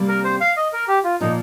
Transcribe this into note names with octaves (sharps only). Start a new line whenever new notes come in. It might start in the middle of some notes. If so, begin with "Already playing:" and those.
Already playing: C3 G3 A#3
A#4
C5
F5
D#5
A#4
G4
F4
A#2 F3 A#3 D#4